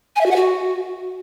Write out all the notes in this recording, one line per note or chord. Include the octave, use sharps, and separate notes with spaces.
G#5
E5
F#4
F#5
F#4